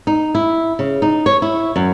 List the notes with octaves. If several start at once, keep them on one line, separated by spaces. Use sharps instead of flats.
D#4
E4
C#3
D#4
C#5
E4
F#2